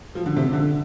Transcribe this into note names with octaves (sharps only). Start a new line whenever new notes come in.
F3
D3
C3
D3